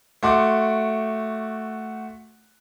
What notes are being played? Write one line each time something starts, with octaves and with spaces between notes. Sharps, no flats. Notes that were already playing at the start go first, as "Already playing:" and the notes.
A3 F#4 C6 D6